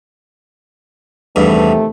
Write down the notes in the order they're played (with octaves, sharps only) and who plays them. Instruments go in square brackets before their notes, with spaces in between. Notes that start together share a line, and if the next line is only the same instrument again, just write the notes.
[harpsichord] E2 G2 [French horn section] C3 D#3 A3